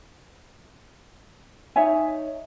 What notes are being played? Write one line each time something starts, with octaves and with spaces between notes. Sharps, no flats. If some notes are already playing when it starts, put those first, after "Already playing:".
D#4 C#5 E5 G#5